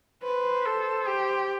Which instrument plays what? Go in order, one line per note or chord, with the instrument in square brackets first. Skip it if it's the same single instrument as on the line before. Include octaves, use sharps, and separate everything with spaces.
[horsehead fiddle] B4 [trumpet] C5
[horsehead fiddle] A4
G4